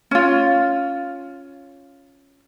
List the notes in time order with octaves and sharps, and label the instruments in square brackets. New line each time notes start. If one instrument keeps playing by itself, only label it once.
[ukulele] C#4 F4